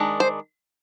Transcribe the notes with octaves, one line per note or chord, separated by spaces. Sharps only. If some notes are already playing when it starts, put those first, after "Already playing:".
Already playing: D#3 G#3 D4
C5